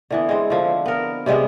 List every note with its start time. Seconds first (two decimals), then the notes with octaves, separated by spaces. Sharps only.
0.10 D3 E3 B3
0.29 G#3 C4
0.50 D3 F3
0.86 B3 A#4
1.26 C3 G3 G#3 B3